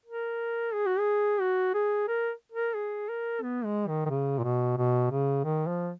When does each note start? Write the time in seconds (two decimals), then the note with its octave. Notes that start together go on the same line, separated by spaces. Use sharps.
0.06 A#4
0.73 G#4
0.86 F#4
0.99 G#4
1.41 F#4
1.74 G#4
2.08 A#4
2.52 A#4
2.75 G#4
3.09 A#4
3.42 B3
3.65 G#3
3.88 D#3
4.05 D#3
4.10 C#3
4.39 A#2
4.43 B2
4.77 B2
5.11 C#3
5.44 D#3
5.67 F3